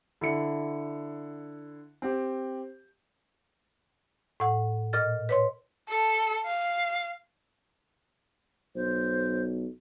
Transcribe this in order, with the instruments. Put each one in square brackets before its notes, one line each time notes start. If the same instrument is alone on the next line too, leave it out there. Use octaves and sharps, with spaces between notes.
[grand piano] D3 E4 C#7
C4 G4
[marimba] A2 F#5
A#2 A#4 D#5 F6 A6
B4 C#5 C6
[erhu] A4
F5
[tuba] B1 [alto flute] C5